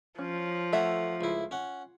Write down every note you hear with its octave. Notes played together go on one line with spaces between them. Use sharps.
F3 C#4
A3 A4 C#5 E5 F#5
C#2 E4
C#4 F#5